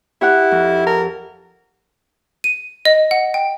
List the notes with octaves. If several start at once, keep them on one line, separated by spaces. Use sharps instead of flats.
E4 G4 C#5 F#5
F2
A#4 A5
D#7
D#5
F#5
G5